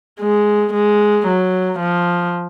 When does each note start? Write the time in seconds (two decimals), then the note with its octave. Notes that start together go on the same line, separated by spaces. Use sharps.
0.21 G#3
0.73 G#3
1.27 F#3
1.79 F3